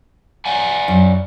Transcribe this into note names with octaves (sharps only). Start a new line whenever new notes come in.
D5 F#5 G#5
F#2